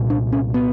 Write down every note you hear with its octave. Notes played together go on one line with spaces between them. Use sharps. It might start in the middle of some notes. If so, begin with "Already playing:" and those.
Already playing: C2 A#2
D4
C#4
B3